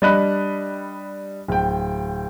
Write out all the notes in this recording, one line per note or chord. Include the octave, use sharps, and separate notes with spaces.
G3 D4 D#5 B5 F#6
D1 G5